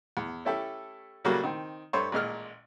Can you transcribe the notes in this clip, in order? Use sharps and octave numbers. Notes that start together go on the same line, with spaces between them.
E2
A3 C#4 E4 G4 A4
C#3 F#3 G3 A3 A#3 F#4
D#3 C4
G2 A3 C5 C#5
A1 A#2 G#3 F6